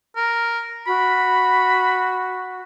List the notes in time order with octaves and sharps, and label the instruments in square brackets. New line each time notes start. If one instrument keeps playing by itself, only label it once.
[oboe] A#4
[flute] F#4 [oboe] B5